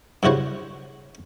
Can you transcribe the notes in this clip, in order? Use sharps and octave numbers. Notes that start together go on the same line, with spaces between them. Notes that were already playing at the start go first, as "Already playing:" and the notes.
G2 C#3 E4 F#4 C5 C#5